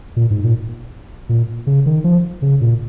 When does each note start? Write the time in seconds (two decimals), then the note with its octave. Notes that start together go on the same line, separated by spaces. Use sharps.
0.16 A#2
0.30 G#2
0.44 A#2
1.29 A#2
1.67 C#3
1.86 D#3
2.04 F3
2.42 C#3
2.61 A#2